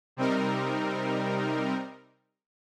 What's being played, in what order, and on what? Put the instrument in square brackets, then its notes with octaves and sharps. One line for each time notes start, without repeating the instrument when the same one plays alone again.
[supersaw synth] C3 G3 C4 D#4 A#4